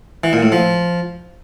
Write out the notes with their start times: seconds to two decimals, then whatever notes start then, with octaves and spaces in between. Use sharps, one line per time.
0.24 E3
0.33 A#2
0.43 A2
0.52 F3